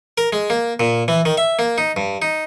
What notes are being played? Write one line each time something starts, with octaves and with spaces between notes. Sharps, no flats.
A#4
G#3
A#3
A#2
E3
D#3
E5
A#3
D#4
G2
D#4